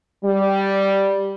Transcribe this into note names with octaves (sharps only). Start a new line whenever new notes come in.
G3